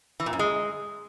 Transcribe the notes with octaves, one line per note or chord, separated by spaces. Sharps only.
E3
A#2
F#2
G#3